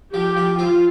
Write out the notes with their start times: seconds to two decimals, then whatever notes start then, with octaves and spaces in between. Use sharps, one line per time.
0.14 F3 G4
0.37 F3
0.59 C4 F4